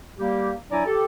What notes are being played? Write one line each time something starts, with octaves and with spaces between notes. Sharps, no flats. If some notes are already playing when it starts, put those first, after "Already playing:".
G3 A#3 G4
F#3 D4 E4 D5 G#5 A#5
G4 A4